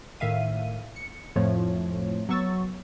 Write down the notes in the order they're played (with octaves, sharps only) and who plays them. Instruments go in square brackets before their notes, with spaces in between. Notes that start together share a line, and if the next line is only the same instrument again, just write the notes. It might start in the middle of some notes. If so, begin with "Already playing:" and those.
[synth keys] A2 D#3 E5 F5 D#7
C#7
F2 A2 F3 A3 F4 C#5
F#3 B3 C#6 E6 A6